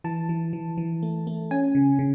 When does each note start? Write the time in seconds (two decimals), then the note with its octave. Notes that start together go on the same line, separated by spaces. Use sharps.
0.04 E3 A5
0.29 E3
0.53 E3
0.78 E3
1.03 A3
1.27 A3
1.51 C#4 G#5
1.75 C#3
1.99 C#3